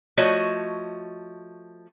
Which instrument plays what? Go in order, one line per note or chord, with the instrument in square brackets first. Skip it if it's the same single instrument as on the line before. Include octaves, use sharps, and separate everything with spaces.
[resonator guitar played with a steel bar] F3 A3 F#4 C#5 D#5